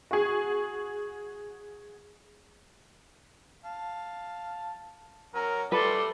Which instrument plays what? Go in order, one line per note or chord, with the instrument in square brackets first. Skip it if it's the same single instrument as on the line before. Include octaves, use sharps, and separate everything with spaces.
[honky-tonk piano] F#4 G#4
[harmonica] F5 A5
[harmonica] F#3 C#4 [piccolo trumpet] A#4
[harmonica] G3 A3 [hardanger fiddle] A4 C6 [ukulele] B4 [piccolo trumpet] D5